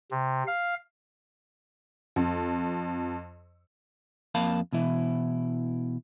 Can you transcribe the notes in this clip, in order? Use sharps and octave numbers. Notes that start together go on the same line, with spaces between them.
C3
F5
F2
F2 A#3 F5 A5 B5
B2 E3 E4